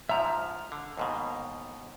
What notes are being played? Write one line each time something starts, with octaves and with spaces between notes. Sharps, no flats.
G#2 F3 E5 A#5
F6
D3
D#2 G#2 B2